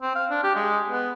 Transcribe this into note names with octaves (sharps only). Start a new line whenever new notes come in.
C4
F5
D4
G4
G#3
B3